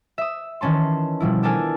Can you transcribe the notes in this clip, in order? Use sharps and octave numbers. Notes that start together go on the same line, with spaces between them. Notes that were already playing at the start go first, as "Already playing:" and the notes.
E5 D#6
D#3 E3 C#4 A5 C6
B2 F3 G3 E4
B3 D4 A4 A#4 D5 G#5